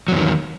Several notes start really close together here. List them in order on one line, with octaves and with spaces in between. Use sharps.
F#3 E2 D#3